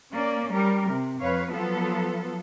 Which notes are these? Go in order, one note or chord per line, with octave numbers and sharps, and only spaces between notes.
A#3 C#4 D5
G3 A#4
C3
F2 B4 C#5 F5
F3 F#3 B3 F4 A4